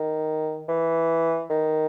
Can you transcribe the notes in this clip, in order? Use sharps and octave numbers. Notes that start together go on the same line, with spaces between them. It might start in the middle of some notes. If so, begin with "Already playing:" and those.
Already playing: D#3
E3
D#3